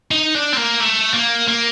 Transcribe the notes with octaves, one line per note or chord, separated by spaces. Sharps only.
D#4
D4
C4
A#3
A3
A#3
A#3